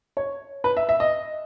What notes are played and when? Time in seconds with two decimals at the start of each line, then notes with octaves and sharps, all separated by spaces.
0.17 C#5
0.64 B4
0.77 E5
0.89 E5
1.00 D#5